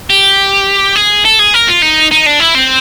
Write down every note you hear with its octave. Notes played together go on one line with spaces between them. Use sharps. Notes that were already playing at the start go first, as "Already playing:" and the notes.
G4
G#4
A4
G#4
A#4
F4
D#4
D#4
D4
E4
C4